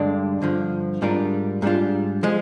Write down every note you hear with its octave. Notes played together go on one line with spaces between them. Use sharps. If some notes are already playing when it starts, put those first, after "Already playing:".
Already playing: G2 D3 G#3 D4
G2 D3 F3
G#2 G3 D4 F4 A#4
G#2 G3 D4 F4
F3 G#3